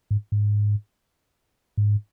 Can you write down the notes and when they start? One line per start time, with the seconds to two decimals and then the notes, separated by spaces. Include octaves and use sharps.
0.11 G#2
0.32 G#2
1.77 G#2